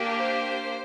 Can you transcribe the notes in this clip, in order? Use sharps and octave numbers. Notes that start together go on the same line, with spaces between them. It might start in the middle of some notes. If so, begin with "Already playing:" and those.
Already playing: A#3 D4 G4
C5